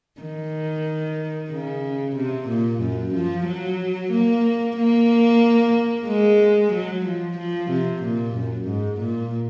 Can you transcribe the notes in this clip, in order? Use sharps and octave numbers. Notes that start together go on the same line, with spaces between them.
D#3
C#3
C3
A#2
F#2
F3
F#3
A#3
A#3
G#3
F#3
F3
F3
C3
A#2
F#2
G#2
A#2